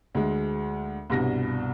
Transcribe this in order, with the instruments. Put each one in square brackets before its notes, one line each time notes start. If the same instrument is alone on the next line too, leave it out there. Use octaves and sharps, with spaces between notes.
[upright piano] D2 G#3
C2 G2 B2 G3 A#6